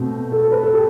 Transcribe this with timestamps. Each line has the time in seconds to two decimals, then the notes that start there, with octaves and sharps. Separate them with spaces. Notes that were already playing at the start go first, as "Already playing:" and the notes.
Already playing: B2 A3 C4
0.32 A4
0.51 B4
0.63 A4
0.74 G4